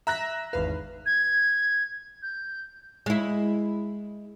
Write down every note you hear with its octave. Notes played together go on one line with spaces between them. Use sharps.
E5 A#5 F#6 A#6
G#1 E2 B4 F5
G#6
G6
G#3 E4